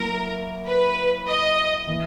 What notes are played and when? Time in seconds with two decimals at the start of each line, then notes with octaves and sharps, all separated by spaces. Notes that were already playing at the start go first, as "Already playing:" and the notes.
Already playing: F#3 A#3 E4 A#4
0.66 B4
1.28 D#5
1.87 E3 A#3 E4